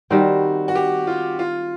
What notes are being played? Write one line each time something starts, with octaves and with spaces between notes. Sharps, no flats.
D#3 G3 C4 F#4
F#4
G4
F4
F4